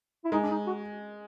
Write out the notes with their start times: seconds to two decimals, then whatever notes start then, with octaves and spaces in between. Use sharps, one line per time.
0.25 E4
0.32 G#3 D#4
0.43 D4
0.50 D#4
0.67 F#4